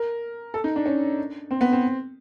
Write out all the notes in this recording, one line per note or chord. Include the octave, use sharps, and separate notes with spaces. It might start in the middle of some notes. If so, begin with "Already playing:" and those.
Already playing: A#4
A4
D#4
D4
C#4
C4
B3
C4